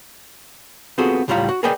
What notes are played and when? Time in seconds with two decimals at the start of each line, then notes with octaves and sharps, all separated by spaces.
0.98 B3 C4 F4 F#4 G#4 A4
1.28 C#2 A2 G3 F4 F5 A#5
1.49 F#4
1.63 G#4 A#4 B4 D5 D#5 G5